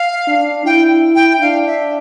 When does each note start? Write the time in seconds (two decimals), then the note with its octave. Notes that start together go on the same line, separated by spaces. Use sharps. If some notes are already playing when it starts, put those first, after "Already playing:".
Already playing: F5
0.28 D4
0.65 E4 G5
1.15 G5
1.41 D4 F5
1.66 E5